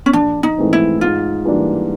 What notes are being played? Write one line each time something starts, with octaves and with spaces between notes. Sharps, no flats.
C#4
A#1 D4
D#4
G#2 E3 A3 C4
E4
G#2 F4
E3 G3 A#3 D4